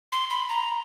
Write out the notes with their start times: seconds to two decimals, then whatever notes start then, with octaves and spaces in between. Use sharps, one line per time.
0.12 C6
0.30 B5
0.49 A#5